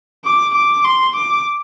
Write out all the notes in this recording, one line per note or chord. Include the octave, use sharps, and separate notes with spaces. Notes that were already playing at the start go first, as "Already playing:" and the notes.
D6
D6
C6
D6